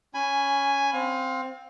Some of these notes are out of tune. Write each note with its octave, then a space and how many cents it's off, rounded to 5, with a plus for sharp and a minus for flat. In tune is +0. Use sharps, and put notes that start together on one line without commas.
C#4 +10 G#5 +0 B5 +15
C4 +0 F5 +30